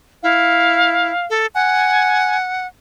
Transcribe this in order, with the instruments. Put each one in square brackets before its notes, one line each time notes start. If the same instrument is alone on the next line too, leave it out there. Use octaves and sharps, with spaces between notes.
[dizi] E4 [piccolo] F5
[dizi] A4
[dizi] F#5 [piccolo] G#5